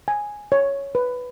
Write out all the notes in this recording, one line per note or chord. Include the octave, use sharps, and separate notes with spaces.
G#5
C#5
B4